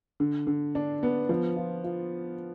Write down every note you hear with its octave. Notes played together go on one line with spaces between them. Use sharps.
D3
D3
D4
B3
F3
F4
F4